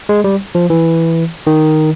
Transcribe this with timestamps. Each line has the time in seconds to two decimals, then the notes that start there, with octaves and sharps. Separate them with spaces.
0.09 G#3
0.24 G3
0.55 F3
0.70 E3
1.47 D#3